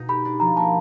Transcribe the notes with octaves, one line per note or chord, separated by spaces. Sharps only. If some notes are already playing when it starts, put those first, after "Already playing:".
Already playing: B2 D#4
G4 B5
D4
F3 A#5
A#3 A5